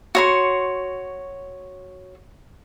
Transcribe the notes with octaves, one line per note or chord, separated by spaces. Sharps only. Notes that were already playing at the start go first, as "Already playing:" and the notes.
F#4 C#5 C6